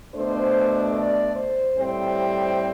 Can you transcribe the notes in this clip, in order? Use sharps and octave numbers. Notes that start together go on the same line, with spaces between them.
B2 A3 D4 C5
D5
C5
A2 G3 C4
C5